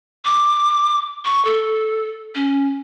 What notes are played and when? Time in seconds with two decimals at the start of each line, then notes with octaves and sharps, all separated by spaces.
0.25 D6
1.25 C#6
1.45 A4
2.35 C#4